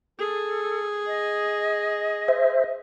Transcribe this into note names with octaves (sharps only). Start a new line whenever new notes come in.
G#4 A4
D#5
C5 E5